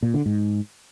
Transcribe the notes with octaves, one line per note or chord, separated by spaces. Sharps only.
A#2
D3
G#2